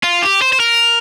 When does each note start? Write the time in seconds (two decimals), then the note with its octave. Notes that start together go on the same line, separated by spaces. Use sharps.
0.04 F4
0.22 G4
0.42 C5
0.53 C5
0.60 A#4